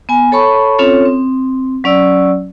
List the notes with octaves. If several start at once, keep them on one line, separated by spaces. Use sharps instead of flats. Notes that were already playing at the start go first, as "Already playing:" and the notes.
B3 G#5
A4 C#5 A5 B5 C#6
C4 C#4 F4 A4 C#5
C4
F#3 C#4 D5 E6